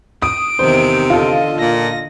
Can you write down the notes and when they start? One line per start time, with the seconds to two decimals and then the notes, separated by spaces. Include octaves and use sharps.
0.22 D#6 D7
0.59 E2 C3 D#3 E3 C5
1.10 D3 F4 A4 D#5
1.58 A#2 A#6